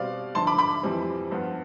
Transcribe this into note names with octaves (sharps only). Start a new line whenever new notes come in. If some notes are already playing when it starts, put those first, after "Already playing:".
Already playing: B2 G3 C4 D5 F5
G2 D3 F3 A5 C6
B5 D6
B5 D6
F2 E3 G3 C4
G2 F3 B3